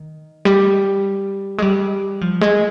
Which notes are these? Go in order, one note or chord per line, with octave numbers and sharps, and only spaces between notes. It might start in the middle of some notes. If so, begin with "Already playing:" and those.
Already playing: D#3
G3
G#3
G3
F3
G#3